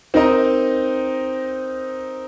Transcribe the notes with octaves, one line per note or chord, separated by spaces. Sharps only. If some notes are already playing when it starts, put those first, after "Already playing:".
C4 D#4 A#4 D#5